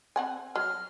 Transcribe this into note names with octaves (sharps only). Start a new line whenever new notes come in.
C4 F#5 G#5
F#3 F6